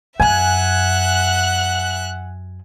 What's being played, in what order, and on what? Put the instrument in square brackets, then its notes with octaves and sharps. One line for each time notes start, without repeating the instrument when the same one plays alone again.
[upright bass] F#2 [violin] E5 F#6 [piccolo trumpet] F#5 [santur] G#5